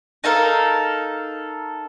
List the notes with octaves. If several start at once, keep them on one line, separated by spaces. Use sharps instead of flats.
D#4 A4 A#4 F5